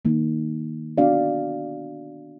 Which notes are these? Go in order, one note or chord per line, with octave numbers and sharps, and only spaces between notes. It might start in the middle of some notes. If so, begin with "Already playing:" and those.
D#3 A#3 D#4
B3 D4 F#4 D5 F5